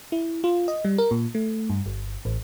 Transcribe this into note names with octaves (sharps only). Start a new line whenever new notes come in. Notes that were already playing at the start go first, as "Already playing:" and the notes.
E4
F4
D#5
G3
A#4
A#2
A3
G2
G1
A1